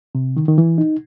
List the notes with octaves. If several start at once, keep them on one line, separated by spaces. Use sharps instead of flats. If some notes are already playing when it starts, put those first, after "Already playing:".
C3
D#3
D#3
E3
D#4